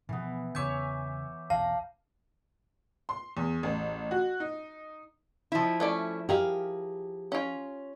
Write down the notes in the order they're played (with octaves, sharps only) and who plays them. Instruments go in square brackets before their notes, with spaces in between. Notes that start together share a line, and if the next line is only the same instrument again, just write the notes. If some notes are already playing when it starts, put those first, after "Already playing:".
[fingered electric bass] B2 F3 [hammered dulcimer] E3 B3
[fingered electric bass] E2 C#3 [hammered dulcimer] C#5 E5 G#5 [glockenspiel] D6 G6
[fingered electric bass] B1 E2 [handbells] F5 [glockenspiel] A5 [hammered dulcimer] A#5
[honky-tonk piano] C6
E2
A1
F#4
D#4
[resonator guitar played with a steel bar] F3 E4
[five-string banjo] A3 C#4 D5
[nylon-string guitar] G4 [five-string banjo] G#4 A#4 F5
[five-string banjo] C#4 F4